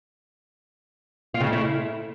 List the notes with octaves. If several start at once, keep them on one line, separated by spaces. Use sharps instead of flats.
F4
C#3
A3
E4